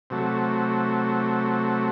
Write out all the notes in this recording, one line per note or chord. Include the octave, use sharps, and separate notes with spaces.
C3 F#3 A3